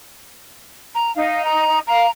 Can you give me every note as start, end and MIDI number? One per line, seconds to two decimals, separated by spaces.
0.95 1.14 82
1.16 1.80 63
1.16 1.42 77
1.45 1.79 82
1.87 2.06 77
1.87 2.11 82